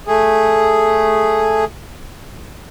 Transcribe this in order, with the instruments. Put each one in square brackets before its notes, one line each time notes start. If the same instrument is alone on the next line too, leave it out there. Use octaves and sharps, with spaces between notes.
[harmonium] A3 G#4